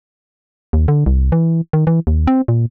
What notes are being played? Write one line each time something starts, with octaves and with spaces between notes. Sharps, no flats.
D#2
D3
C2
E3
D#3
E3
D#2
C4
A#2